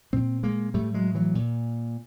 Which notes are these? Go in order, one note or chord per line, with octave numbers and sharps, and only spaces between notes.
A#2 A#3 C4
G#3 A#3
A2 G3 A3
F#3 G#3
E3 F#3
A#2